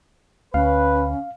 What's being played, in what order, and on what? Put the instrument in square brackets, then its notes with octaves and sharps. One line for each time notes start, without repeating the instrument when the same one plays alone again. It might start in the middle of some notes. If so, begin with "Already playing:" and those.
[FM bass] D2 [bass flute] C#4 [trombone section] B4 [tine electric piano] F5